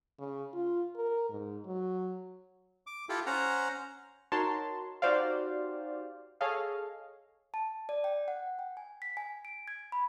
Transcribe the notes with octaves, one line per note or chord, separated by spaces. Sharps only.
C#3
F4
A#4
G#2
F#3
D6
E4 F4 G4 A4
C#4 C5 F#5 A#5
D#4 F#4 A#4 C#5 A5 C6
D#4 F#4 G4 C5 D5 F5
G#4 A4 C#5 D#5 F5
A5
D5
G5
F#5
G5
G#5
B6
G#5
D7
G#6
B5